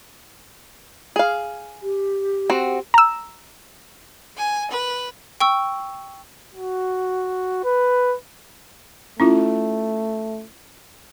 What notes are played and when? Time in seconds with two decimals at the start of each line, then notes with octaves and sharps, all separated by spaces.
1.16 G#4 F5
1.82 G4
2.50 C4 F#4
2.94 A#5 E6
4.37 G#5
4.70 B4
5.40 G5 C#6 E6
6.55 F#4
7.64 B4
9.20 A3 C#4 E4 F4